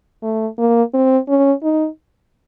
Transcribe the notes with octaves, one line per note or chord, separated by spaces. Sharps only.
A3
A#3
C4
C#4
D#4